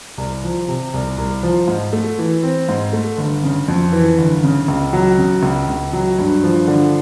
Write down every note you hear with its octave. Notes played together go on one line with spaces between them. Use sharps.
C2
F3
C3
C2
C2
F3
G#2
A3
E3
C4
G#2
A3
G1
C#3
F2
E3
G1
C#3
C#2
F#3
C#3
C#2
C#2
F#3
G2
F3
D3